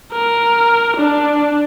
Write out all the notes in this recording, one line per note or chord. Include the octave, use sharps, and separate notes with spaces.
A#4
D4